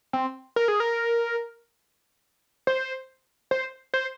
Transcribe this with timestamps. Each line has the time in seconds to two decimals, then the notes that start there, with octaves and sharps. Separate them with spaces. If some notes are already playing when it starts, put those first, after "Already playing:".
0.13 C4
0.56 A#4
0.68 G#4
0.80 A#4
2.67 C5
3.51 C5
3.94 C5